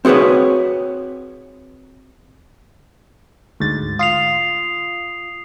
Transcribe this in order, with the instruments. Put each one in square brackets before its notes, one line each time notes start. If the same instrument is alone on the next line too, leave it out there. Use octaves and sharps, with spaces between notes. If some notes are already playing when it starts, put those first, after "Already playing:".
[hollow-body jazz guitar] C4 F#4 G#4 B4 C#5
[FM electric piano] D2 G#2 A6
[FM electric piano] F4 [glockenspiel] D#6 C7 F7